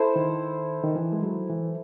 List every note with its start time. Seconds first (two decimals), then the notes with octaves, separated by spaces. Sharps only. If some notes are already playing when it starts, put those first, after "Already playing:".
Already playing: E4 A4 C5
0.16 D#3
0.84 D#3
0.96 E3
1.12 G#3
1.22 F#3
1.50 E3